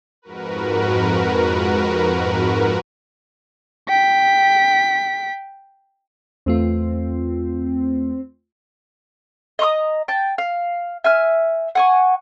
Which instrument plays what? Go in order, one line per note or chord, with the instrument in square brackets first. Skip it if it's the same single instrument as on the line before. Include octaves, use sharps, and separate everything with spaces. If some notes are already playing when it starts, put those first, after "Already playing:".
[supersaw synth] F2 G#2 F#4 A#4 B4
[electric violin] G5 B6
[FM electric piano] E2 A3 F4 [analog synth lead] C4
[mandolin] D#5 A#5 C#6 D#6
G5 A5
F5
E5 G#5 F6
F#5 G#5 C#6